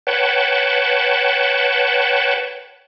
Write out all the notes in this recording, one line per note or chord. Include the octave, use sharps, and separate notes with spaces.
B4 C#5 F#5 G5 A5